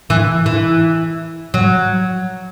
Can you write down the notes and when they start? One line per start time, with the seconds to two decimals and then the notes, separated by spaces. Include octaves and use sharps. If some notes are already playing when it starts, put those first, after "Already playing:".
0.10 E3
0.46 E3
1.54 F#3